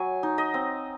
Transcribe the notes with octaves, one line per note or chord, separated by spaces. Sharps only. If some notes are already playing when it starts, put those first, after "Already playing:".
Already playing: F#3 G#5
D#4
D#5
C4